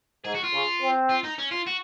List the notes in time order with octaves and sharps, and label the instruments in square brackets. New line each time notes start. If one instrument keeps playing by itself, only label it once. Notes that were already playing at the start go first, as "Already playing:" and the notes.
[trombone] G#2 [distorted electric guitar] G#4
[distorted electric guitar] F#4
F4
[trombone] C#3
C4
[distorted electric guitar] F4
D#4
C#4
F4
F#4